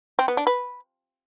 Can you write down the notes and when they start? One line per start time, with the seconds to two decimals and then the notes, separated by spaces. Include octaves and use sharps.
0.19 C4
0.28 B3
0.37 D4
0.47 B4